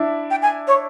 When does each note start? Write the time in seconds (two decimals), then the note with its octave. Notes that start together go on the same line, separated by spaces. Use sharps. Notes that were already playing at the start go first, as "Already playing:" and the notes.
Already playing: D4 E4
0.31 G5
0.42 G#5
0.67 C#5